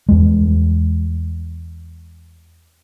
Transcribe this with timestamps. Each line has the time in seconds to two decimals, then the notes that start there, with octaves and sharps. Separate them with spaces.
0.09 E2 G#3